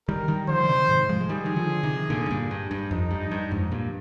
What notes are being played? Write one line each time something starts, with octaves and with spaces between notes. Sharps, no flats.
D#3 G3 A#4
D#3 G3
D3 F3 C5
F3
C3 D#3
G#2 C3
F3 G#3
G#3
D#3 G3 G#4
D#3
D3 F3
C3 D#3
A#2 D3
G#2
G2 A#2
G2
G2
F2 D#4
G2
G2
F2 G#2
G2 A#2